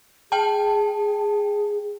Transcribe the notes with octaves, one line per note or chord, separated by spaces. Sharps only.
G#4 G5 A5